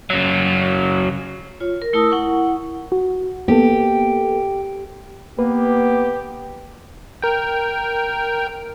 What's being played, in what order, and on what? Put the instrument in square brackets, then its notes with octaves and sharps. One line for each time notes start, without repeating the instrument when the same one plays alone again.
[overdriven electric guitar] C#3 F#3
[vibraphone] F4 C#5
A#4
A3 E4 A#4 A5 D#6 E6
E4 F#5 C#6
[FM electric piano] F#4
[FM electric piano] A#3 B3 A4 [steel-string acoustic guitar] G4
[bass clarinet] A#3 [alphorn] B3 [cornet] G4 [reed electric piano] B4
[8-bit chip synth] A#4 G5